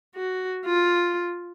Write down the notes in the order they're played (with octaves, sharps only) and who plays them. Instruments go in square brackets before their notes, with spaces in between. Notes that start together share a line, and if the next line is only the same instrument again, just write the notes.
[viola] F#4
F4